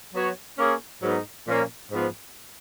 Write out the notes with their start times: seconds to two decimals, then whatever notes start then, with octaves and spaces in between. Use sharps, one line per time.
0.13 F#3 B3 F#4 C#5
0.58 A#3 C#4 G#4 C#5
1.03 G#2 F#3 B3 D#4 A#4
1.46 A#2 F3 A#3 C#4
1.91 G#2 F3 B3